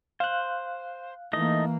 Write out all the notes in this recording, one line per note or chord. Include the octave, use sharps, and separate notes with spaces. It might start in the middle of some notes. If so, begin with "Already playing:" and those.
C5 F5 F#6
E3 A3 A#3 D#4 D#5